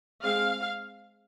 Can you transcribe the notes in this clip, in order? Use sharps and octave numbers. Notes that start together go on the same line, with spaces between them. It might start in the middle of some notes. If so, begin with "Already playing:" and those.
G#3 C4 F5